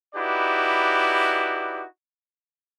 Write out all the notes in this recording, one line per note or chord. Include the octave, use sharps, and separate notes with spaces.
D#4 E4 F#4 G4 B4 D5